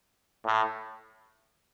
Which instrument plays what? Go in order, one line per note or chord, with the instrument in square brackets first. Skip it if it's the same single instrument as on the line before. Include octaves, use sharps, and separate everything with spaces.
[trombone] A2